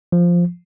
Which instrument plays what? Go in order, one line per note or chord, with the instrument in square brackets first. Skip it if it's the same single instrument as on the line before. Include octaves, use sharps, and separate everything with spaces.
[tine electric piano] F3